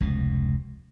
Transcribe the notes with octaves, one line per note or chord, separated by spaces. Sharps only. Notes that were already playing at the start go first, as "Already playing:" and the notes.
F1 C#2 B2